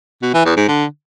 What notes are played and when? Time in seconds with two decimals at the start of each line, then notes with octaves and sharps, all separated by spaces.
0.22 B2
0.34 E3
0.45 E2
0.57 G#2
0.68 D3